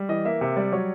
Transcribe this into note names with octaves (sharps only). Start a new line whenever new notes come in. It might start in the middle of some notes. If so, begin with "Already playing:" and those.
Already playing: G3
E3 D#5
A#3 E5
C3 E5
G3 D5
F#3 C#5